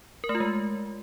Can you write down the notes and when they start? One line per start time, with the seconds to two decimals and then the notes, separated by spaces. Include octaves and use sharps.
0.24 A#4
0.29 A3
0.35 F4
0.40 G#3